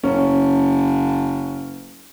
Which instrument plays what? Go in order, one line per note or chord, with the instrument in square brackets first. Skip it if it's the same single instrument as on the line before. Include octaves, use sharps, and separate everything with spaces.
[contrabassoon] F#1 [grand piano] C#4